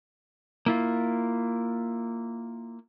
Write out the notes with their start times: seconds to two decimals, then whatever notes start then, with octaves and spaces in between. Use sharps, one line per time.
0.66 A#3 E4 F4